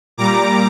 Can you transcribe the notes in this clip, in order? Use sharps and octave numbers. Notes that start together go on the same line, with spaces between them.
A#2 G3 A#5 D6